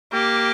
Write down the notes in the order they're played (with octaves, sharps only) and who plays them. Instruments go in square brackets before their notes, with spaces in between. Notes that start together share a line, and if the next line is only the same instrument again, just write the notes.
[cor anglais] A#3 [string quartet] G4